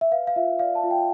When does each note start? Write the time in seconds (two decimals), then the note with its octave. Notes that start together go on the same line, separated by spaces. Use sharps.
0.01 E5
0.11 B4 F5
0.27 F5
0.36 F4 E5
0.59 D5 F5
0.75 A5
0.83 F4
0.91 G5